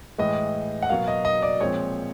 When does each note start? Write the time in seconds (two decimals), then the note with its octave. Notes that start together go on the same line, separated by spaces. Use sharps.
0.18 A2 E3 G#3 D#5
0.82 F#5
0.89 B2 F#3 A#3 F5
1.08 D#5
1.25 D#5
1.42 D5
1.60 A#2 F3 G#3 C4 C#5